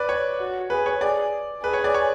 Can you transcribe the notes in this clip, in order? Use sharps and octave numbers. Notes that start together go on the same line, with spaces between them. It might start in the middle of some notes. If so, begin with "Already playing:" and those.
Already playing: B4 D5
C#5
F#4
G#4 B4
C#5
G#4 D5
G#4 B4
C#5
D5
C#5